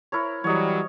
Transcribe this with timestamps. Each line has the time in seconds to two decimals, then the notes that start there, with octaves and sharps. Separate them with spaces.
0.12 E4 A#4 C#5
0.44 E3 F#3 G3 C#5 D#5